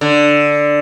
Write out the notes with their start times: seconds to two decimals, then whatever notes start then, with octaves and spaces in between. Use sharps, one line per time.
0.01 D3